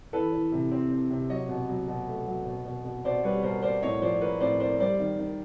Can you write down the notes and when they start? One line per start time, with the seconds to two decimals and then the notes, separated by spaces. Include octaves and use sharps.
0.13 E3 A4 B4
0.32 E3
0.52 C3
0.71 C4
0.91 C4
1.10 C3
1.30 F#3 C#5 D#5
1.49 B2
1.69 F#3
1.88 B2
2.08 A3
2.27 F#3
2.46 B2
2.65 B2
2.85 B2
3.04 B2 C5 D5
3.24 G3 B4 C#5
3.43 B2 A#4 C5
3.63 A#3 C5 D5
3.82 A2 C#5 D#5
4.02 F3 C5 D5
4.21 A#3 B4 C#5
4.40 A2 C5 D5
4.60 A#3 C5 D5
4.80 G3 C5 D5
5.00 D#3
5.19 D#3